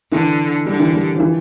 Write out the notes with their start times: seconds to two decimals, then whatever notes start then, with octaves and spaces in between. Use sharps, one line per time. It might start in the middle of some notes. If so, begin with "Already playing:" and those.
0.12 D3 E3
0.66 D3 G3
0.80 E3
0.93 G3
1.16 F3
1.20 E3